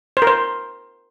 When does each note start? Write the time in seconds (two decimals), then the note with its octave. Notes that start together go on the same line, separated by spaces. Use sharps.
0.17 C5
0.22 A#4
0.27 C5